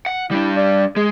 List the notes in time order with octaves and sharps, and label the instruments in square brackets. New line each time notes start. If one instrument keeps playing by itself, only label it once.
[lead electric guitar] F#5
[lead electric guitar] G3 D4 [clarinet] E4
[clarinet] D5
[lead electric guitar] G#3 [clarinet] G#4